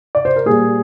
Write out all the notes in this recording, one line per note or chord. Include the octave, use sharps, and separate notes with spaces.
D5
C5
A#4
A#2 G3 A#3 G#4